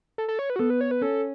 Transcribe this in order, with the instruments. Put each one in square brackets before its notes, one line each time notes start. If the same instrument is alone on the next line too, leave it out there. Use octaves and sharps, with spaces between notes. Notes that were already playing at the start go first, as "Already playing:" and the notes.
[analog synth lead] A4
A4
C#5
B4
F#4
[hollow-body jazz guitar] B3 [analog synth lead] A4
[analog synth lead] B4
C#5
B4
[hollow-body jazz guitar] C#4 [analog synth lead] A4